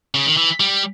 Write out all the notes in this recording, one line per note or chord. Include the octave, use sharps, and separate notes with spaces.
C#3
D#3
E3
G3